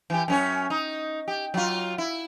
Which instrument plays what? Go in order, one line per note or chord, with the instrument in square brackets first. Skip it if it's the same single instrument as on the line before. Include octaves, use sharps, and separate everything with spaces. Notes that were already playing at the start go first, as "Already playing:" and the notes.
[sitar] E3 G4
F#2 C#4 C#5
D#4
G4
F#3 F4
E4